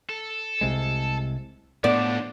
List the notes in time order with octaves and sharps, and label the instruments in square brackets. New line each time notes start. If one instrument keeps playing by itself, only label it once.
[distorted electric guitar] A4
[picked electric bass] C2 C3 G#3
[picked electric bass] A2 B3 [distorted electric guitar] F3 D4 [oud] D5